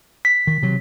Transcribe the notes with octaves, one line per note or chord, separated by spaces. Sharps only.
B6
D#3
C3 F#3